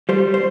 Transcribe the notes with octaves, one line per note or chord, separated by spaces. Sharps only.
G3 C5
C5